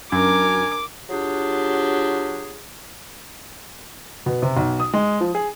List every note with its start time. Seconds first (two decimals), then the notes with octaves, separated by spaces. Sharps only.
0.12 F#2 D4 A#4 G#5 D6
1.10 F#3 D4 F4 G4 G#4
4.26 B2
4.42 C3
4.57 B1
4.80 D#6
4.93 G#3
5.20 F3
5.35 G#4